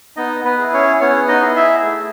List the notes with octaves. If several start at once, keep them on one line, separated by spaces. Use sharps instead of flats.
B3 D#4 D#5
B3 B4
E4 G#4
C#4 C#5
B3 C#4 C#5
D#4 D#5
E4 G#4
E4 E5
A3